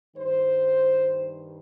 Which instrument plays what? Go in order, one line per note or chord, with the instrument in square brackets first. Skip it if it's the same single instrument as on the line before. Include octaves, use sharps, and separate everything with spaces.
[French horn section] G2 D#3 G3 C5